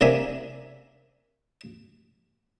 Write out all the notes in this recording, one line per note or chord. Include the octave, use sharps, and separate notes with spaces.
C3 A#3 D4 E5 G#5